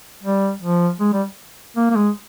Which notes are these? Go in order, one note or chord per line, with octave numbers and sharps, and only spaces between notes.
G3
F3
G#3
G3
A#3
A#3
G#3